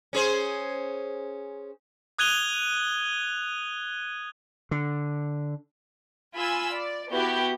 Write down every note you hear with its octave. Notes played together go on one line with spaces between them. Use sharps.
C#4 G#4 C5
D#6 F#6 G#6 D#7 F7 G7
D3
F4 G#5 B5 E6
D5
B3 E4 F#4 G4 G6